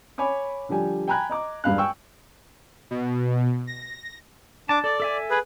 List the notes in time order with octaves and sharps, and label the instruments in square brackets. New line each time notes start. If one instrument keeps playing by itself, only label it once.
[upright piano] C#5 G#5 B5 D6
D3 F3 G3 G4 G#5
G5 G#5 A#5 B5 F#6 G#6
D#5 A#5 D6
E1 G2 F5 B5 F#6
G5 G#5 C#6 E6
[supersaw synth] B2
A#6
[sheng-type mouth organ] D4 D6 [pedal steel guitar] A5
[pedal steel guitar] A4 [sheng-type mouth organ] D5
[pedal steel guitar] A4 E5 G#5
[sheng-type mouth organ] G#4 B4